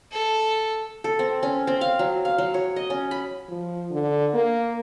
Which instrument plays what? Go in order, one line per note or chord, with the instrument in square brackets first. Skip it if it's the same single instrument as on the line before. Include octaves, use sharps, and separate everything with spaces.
[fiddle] A4
[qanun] A4
C4
C#4
C4
F5
F#3
F5
F#3
C#5
D#5
C#4
B5
[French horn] F3
D3
A#3